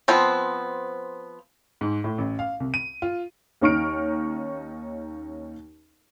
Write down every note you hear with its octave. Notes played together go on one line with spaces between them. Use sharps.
F3 B3 C4
G#2
A2
A1
F5
C2
D#7
F4
D#2 C#4 D#4 C#6 F6 D7